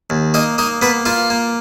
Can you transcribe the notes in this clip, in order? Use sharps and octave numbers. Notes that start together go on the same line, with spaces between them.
D#2
A#3 D#4 D#5
A#3 D#4 D#5
A#3 B3 B4
A#3 F4 F5
A#3